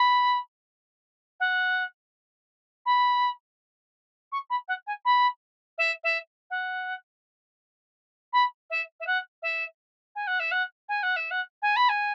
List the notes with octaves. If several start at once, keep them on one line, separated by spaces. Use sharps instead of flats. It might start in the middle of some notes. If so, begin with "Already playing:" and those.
Already playing: B5
F#5
B5
C#6
B5
F#5
G#5
B5
E5
E5
F#5
B5
E5
E5
F#5
E5
G#5
F#5
E5
F#5
G#5
F#5
E5
F#5
G#5
B5
G#5